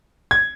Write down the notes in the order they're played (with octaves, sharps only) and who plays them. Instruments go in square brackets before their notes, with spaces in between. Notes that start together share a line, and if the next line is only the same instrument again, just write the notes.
[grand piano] G#6